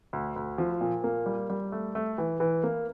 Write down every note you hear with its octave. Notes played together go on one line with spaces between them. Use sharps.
D2
D2
F3
A#2
A#3
G3
G3
A3
A3
E3
E3
A#3